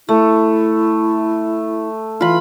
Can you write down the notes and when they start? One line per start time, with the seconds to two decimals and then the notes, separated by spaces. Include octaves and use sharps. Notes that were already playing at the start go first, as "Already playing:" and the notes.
0.09 A3 E4
2.21 E3 F4 B5